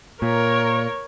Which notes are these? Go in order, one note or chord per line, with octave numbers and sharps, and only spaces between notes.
A#2 A#4 C#5